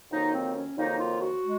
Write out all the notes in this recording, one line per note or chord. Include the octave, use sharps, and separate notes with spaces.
F2 D#3 F#3 A#3 D#4
C4
C#4
F2 D#3 F#3 A#3 D#4
F4
F#4
G#3